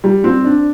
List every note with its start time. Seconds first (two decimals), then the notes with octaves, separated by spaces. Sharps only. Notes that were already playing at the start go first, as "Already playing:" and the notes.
0.04 G3
0.24 C4
0.44 D4